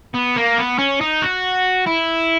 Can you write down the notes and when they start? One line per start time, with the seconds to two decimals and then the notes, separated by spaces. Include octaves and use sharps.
0.14 B3
0.36 A#3
0.58 B3
0.79 C#4
1.01 D#4
1.22 F#4
1.87 E4